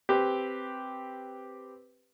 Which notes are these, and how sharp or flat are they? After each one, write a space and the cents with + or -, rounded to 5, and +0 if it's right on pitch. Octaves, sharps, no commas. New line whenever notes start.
C4 +0 G4 +0 B4 +0